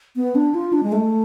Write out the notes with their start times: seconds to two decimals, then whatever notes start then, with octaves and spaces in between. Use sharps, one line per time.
0.16 B3
0.35 D4
0.54 F4
0.73 D4
0.83 G#3
0.92 A3